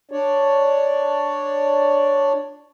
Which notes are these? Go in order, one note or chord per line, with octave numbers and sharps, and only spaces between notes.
D4 C#5 D5